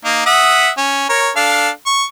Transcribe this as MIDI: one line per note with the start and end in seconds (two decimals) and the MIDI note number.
0.05 0.25 58
0.05 0.25 63
0.26 0.70 76
0.26 0.70 78
0.26 0.70 87
0.78 1.09 61
1.09 1.31 70
1.09 1.31 73
1.36 1.69 62
1.36 1.69 69
1.36 1.69 77
1.86 2.04 85